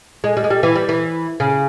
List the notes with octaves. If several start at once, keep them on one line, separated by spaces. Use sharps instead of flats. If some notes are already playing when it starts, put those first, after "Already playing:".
G#3
G3
G#3
G3
E3
G3
E3
C#3